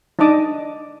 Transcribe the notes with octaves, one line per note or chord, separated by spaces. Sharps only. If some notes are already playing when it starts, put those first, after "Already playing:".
D4 D#4 D#5 A5 D6 D#6